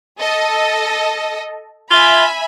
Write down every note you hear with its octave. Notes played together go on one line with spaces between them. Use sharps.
A4 D#5
F4 E5 G#5 B5